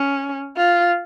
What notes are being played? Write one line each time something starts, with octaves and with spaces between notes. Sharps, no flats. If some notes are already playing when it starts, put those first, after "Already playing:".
Already playing: C#4
F4